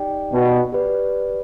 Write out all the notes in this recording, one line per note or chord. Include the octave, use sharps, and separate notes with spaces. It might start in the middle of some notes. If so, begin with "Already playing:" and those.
Already playing: D#4 G4 D5 G5
B2
G4 B4 D5